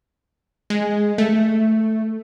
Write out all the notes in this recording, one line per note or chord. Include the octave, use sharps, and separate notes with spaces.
G#3
A3